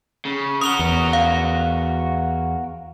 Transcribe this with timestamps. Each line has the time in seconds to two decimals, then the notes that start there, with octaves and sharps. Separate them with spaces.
0.25 C#3
0.61 F#4 A#4 D#6 F7 G7
0.79 E2
1.13 F5